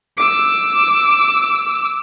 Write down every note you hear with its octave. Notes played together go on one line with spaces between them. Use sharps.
D6 E6